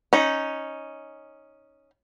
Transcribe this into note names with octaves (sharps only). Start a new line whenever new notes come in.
C#4 D#4